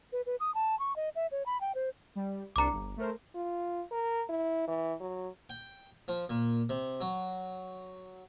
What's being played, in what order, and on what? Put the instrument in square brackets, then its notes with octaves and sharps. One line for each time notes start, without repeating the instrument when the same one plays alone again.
[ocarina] B4
B4
D#6
A5
C#6
D#5
E5
C#5
B5
G5
C5
[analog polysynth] G3
[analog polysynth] C2 D4 C#7 [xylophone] A#5 D6
[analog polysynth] G1
A3 A#4 C5
[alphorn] F4
A#4
E4
E3
F#3
[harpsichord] G5
F3
A#2
C3
F#3